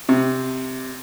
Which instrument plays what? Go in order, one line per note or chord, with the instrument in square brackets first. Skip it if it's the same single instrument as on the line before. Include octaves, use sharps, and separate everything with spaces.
[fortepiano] C3